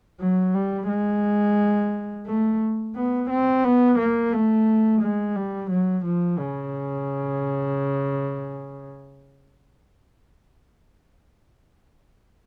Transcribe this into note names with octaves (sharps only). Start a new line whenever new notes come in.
F#3
G3
G#3
A3
B3
C4
B3
A#3
A3
G#3
G3
F#3
F3
C#3